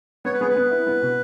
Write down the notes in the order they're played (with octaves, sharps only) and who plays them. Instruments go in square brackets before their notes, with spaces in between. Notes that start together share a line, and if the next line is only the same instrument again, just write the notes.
[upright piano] B3 [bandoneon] C#5
[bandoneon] B4
[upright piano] B3 [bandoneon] G#4
[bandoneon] B4
[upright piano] B3
E4
B3
B2